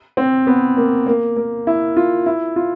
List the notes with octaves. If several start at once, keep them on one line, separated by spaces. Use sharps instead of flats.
C4
B3
A#3
A#3
A#3
E4
F4
E4
F4